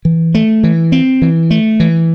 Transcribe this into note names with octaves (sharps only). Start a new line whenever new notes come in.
E3
A3
E3
C4
E3
A3
E3